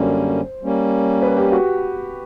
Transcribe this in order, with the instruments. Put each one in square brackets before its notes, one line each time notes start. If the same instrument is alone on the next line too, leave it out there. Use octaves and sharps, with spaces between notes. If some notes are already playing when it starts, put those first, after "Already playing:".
Already playing: [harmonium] F#2 D3 G3 A#3 C#4 [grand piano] C5
[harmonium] G3 A#3 C#4
[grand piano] B4
G4
F#4